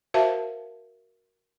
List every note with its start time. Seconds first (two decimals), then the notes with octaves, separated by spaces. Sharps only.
0.14 F#4 A#4 C5 E5 F5 A5